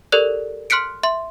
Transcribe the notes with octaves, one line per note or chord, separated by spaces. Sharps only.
G4 A4 A#4 D5 F#6
C6 F6 F#6 B6 C#7 D7
E5 C6